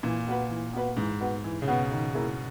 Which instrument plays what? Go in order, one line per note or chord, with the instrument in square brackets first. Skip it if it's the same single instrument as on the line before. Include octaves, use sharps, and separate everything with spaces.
[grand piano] A#2 [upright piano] E3
[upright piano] B3 F#4 B4
E3
B3 F#4 B4
[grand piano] G#2 [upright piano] E3
[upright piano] B3 F#4 B4
E3
[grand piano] C#3
[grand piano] B2 [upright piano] B3 F#4 B4
[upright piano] D#3
A#3 E4 G#4